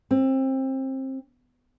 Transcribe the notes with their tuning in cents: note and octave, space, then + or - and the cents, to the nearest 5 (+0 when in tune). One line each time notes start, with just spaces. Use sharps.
C4 +25